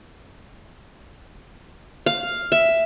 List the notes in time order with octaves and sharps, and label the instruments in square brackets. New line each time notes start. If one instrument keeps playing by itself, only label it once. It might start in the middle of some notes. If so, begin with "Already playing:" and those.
[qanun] F5
E5